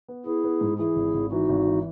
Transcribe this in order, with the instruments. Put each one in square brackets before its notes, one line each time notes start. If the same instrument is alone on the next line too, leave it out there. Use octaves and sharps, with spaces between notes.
[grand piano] B3
[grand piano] B3 [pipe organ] E4 G#4
[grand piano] B3
G#2
[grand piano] E3 [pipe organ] E4 G#4
[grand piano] G#1
G#1
[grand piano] E3 [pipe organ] D#4 F#4
[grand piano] G#1
E3